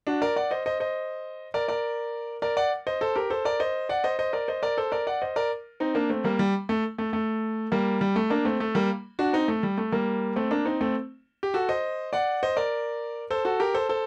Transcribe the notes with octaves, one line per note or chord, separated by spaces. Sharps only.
D4 F#4
A#4 D5
D5 F#5
C5 D#5
C5 D#5
C5 D#5
A#4 D5
A#4 D5
A#4 D5
D5 F#5
C5 D#5
A4 C5
G4 A#4
A4 C5
A#4 D5
C5 D#5
D5 F#5
C5 D#5
C5 D#5
A#4 D5
C5 D#5
A#4 D5
A4 C5
A#4 D5
D5 F#5
C5 D#5
A#4 D5
C4 D#4
A#3 D4
A3 C4
G3 A#3
G3
A3
A3
A3
G3 A#3
G3
A3
A#3 D4
A3 C4
A3
G3 A#3
D4 F#4
C4 D#4
A3
G3
A3
G3 A#3
A3 C4
A#3 D4
C4 D#4
A3 C4
G4
F#4 A4
C5 D#5
D5 F#5
C5 D#5
A#4 D5
A4 C5
F#4 A4
G4 A#4
A4 C5
A4 C5